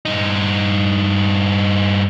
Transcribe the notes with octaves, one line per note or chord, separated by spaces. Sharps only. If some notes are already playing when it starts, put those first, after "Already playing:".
G2 D#4